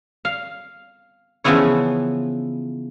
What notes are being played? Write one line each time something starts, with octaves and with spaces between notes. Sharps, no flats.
F5
C#3 E3 F3 B3 E4 C#5